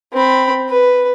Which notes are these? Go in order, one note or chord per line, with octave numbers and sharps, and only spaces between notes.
C4 B5
B4